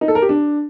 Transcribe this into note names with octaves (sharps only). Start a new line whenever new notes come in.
D#4
A4
A#4
G4
D4